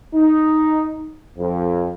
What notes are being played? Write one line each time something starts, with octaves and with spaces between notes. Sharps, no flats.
D#4
F2